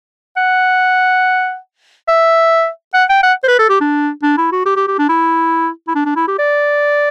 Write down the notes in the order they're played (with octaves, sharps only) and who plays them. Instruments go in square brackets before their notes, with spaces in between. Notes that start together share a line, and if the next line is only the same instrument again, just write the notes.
[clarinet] F#5
E5
F#5
G5
F#5
C5
B4
A4
G4
D4
D4
E4
F#4
G4
G4
G4
D4
E4
E4
D4
D4
E4
G4
D5